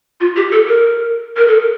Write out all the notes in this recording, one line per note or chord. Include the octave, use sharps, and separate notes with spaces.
F4
G4
A4
A#4
A#4
A4